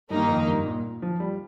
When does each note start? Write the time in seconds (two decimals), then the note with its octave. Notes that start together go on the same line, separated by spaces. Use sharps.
0.10 G2 D#3 A#3 D#4
0.29 F2
0.47 G2
0.66 A#2
1.02 F3
1.20 G3